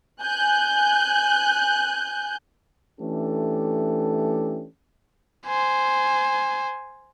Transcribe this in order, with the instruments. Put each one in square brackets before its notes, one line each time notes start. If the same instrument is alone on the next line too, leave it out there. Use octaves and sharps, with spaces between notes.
[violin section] G#5 F#6 G6
[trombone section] E3 A3 C#4 D4 G4 A4
[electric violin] C5 G#5